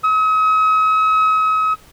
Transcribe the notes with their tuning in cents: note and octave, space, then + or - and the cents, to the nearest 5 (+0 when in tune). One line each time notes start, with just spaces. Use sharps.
D#6 +45